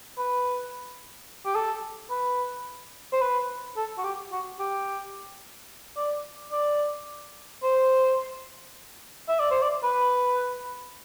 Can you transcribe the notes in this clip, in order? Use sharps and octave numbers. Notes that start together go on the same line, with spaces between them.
B4
G4
A4
B4
C5
B4
A4
F#4
G4
F#4
G4
D5
D5
C5
E5
D5
C5
D5
B4